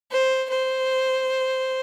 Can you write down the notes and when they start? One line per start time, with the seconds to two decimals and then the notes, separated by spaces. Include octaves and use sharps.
0.11 C5
0.49 C5